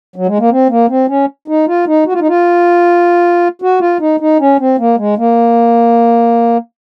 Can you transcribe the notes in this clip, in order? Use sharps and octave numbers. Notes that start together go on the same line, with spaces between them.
F#3
G#3
A#3
C4
A#3
C4
C#4
D#4
F4
D#4
F#4
F4
D#4
F4
F#4
F4
D#4
D#4
C#4
C4
A#3
G#3
A#3